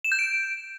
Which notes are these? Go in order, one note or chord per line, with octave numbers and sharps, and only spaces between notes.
E7
G6
D7